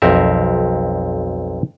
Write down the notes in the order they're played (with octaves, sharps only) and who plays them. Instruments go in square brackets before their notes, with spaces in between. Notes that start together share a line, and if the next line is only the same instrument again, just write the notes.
[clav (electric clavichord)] B1 F2 C4 A#4 E5